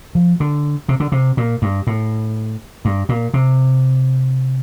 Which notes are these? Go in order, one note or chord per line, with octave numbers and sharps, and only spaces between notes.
F3
D3
C3
D3
C3
A#2
G2
A2
G2
A#2
C3